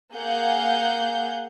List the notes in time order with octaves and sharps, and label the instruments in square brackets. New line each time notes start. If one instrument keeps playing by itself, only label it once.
[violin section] A#3 G#4 F5 F#5 G6